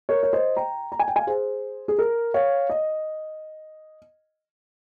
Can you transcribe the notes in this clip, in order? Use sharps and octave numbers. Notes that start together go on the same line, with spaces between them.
A#4 C#5
C#5
C5 D#5
G5 A#5
A#5
G#5
G5
F5 G#5
G#4 C5
G#4
A#4
C#5 F5
D#5